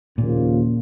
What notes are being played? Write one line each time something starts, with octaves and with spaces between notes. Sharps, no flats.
D#2 A#2 C#3 F3 A#3 F4